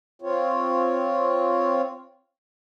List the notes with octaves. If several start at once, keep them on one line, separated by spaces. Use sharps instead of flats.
C4 F4 C#5